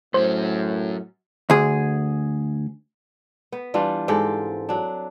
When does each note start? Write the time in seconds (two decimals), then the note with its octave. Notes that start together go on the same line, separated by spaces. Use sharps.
0.14 F#2 A2 F#3 C5
1.50 D2 G#4
3.52 B3
3.74 E3 G3 D4 F4
4.08 G#2 C4 G4 A4
4.69 F#3 D4